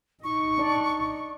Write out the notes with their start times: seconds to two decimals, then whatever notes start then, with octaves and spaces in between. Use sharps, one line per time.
0.24 D#4 C#6
0.58 D4 D5